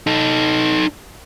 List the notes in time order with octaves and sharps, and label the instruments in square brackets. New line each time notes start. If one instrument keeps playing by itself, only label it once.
[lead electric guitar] D#4 A4